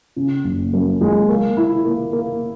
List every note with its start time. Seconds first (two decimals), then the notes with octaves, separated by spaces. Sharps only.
0.16 C#3
0.44 F#1
0.73 F#2
1.01 G#3
1.29 A#3
1.57 E4
1.85 A#3
2.13 A#3